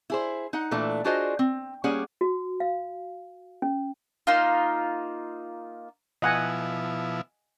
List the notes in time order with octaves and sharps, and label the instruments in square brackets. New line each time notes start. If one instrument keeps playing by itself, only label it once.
[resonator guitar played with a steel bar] E4 G#4 C5
D#4 F#5
A#2 E3 A3 D4
D4 F4 F#4 G#4 C5 D#5
C4
G3 A#3 C#4 G#4 F#5
[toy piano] F#4
F5
C#4
[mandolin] A#3 D#4 F4
[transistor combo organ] B2 F3 E4 [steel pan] D#5 F#5 G#5